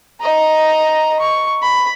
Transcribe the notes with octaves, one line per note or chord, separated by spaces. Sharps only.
D#5 A#5
C#6
B5